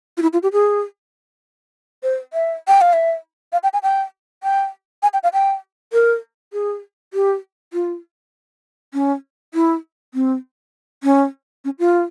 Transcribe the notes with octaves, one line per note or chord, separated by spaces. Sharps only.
F4
E4
F4
G4
G#4
C5
E5
G5
F5
E5
F5
G5
G#5
G5
G5
G#5
G5
F5
G5
A#4
G#4
G4
F4
C#4
E4
C4
C#4
C#4
F4